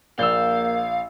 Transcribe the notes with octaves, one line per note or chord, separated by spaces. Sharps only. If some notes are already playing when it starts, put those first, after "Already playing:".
A#1 A#3 D5 F5 E6 G6